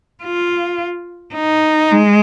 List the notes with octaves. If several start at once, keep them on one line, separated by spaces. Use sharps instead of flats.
F4
D#4
G#3